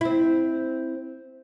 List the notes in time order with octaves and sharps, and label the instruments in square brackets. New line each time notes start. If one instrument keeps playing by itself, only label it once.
[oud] C4 E4